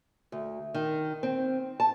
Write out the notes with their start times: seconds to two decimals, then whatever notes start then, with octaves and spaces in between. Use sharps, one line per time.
0.32 D2
0.74 D#3
1.23 C4
1.80 A5